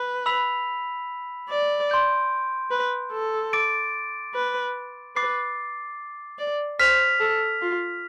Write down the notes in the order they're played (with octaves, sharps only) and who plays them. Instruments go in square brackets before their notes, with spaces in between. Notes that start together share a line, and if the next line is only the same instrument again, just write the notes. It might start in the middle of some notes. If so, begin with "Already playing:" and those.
Already playing: [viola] B4
[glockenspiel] B5 E6 B6 F7
[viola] D5
[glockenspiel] C6 G6 D7
[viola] B4
A4
[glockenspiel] D6 A6 D7
[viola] B4
[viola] B4 [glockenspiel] D6 A6 C7
[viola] D5
[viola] C5 [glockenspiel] F6 B6 F7
[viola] A4
F4